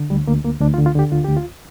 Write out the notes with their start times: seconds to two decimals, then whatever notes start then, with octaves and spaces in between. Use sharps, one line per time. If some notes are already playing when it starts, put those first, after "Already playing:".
Already playing: D3
0.10 D2 G3
0.27 D2 A#3
0.44 D2 A#3
0.61 D2 D4
0.74 F4
0.78 D3
0.86 F4
0.95 D3 G4
1.12 D2 F4
1.24 D2 G4
1.37 F4